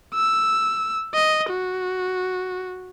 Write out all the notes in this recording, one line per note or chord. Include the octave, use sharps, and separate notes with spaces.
E6
D#5
F#4